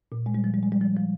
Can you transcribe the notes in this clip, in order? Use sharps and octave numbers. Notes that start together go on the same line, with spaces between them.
A#2
G#3
G3
F3
G3
G#3
G3
F3
F3